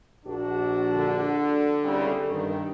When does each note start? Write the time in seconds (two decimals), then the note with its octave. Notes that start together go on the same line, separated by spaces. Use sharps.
0.26 A#1 D4 F#4
0.94 D3
1.84 C2 C#3 G3
2.29 G2 D#3